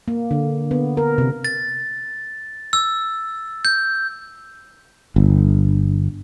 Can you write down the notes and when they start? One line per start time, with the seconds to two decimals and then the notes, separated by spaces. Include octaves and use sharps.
0.08 A#3
0.31 D3
0.71 B3
0.97 A#4
1.18 C3
1.45 A6
2.73 E6
3.65 G6
5.16 G1